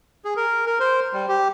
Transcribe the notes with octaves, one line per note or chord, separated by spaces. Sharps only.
G#4
A#4
A#4
C5
G3
G4